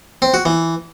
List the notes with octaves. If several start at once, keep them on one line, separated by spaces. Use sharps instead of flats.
C4
F#4
E3